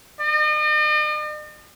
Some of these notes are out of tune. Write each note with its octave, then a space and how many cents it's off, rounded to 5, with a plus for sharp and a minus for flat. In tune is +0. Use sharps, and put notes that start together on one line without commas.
D#5 -45